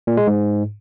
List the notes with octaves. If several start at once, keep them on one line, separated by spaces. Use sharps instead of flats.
A#2
G#3
G#2